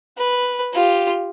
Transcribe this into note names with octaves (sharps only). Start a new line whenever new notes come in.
B4
F4 G4